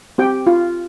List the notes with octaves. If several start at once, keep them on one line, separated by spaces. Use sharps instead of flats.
C4 G4 G5
F4